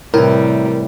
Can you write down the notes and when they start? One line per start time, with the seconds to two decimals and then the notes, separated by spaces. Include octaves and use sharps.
0.14 A2 C3 E3 G3 A#4